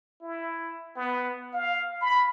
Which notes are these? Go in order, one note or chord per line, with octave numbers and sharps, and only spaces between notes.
E4
B3
F5
B5